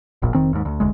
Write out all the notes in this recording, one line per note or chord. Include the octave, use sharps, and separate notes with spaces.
E1 A#1 A#2
F1 D#3 C4
D#2 G#2
D2
F1 D2 G#3